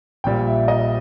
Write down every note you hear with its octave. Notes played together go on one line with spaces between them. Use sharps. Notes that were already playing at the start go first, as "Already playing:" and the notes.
A#1 A#2 G3 G5
E5
D#5